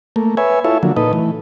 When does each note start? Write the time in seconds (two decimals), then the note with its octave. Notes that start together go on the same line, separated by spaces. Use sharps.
0.16 A3 A#3
0.37 B4 C#5 E5 G#5
0.64 E4 F4 A4 C#5 E5
0.83 D3 F3 F#3 A#3
0.96 A#2 D#4 A4 B4 D#5
1.13 E3 A3